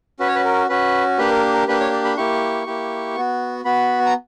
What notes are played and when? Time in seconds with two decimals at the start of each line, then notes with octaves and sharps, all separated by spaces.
0.20 C#4 F#4 B4
0.28 C#5
0.35 B4
0.45 A#4
0.69 C#4 F#4 B4
1.18 A#3 D4 G4 B4
1.30 A#4
1.53 A#4
1.68 A#3 D4 G4 B4
1.80 C#5
1.92 D5
2.05 B5
2.17 A#3 E4 G4 C#6
2.66 A#3 E4 G4
3.16 B3 F#4
3.65 B3 F#4 B5
4.06 A#5